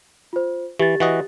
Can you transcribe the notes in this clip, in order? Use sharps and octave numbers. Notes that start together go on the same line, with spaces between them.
F4 C5
E3 G4 A6
E3 F#4 D#5